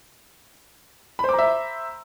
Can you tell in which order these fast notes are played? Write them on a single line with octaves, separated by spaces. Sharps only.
B5 C5 D6 A#5 E5